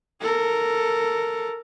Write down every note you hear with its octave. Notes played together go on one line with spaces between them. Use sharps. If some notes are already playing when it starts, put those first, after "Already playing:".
A4 A#4